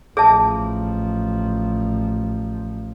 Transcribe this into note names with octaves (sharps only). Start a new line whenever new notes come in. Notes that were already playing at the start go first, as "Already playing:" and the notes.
A1 F3 G#4 E5 A5